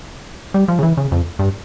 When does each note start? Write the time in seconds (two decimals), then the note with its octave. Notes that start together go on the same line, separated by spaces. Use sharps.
0.54 G3
0.68 F3
0.79 C#3
0.83 E3
0.97 C#3
1.12 F2
1.39 G2